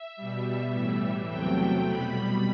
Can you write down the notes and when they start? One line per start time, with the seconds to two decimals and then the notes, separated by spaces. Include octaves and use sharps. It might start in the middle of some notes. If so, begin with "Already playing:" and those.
Already playing: E5
0.17 B2 G3
0.73 A2 E3 G3
1.29 E2 C3 F#3 A3 G5
1.86 B2 G3 B5